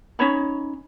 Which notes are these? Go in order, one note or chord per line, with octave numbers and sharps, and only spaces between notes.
C#4 D#4 C#5 B5